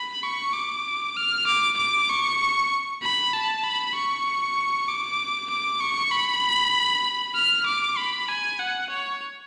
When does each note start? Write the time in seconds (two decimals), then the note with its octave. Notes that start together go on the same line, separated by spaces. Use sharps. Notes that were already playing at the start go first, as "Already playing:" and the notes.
Already playing: B5
0.23 C#6
0.54 D6
1.17 F6
1.46 D6
1.77 D6
2.10 C#6
3.02 B5
3.33 A5
3.64 B5
3.95 C#6
4.88 D6
5.50 D6
5.80 C#6
6.11 B5
7.35 F6
7.66 D6
7.97 B5
8.28 G#5
8.59 F#5
8.90 C#5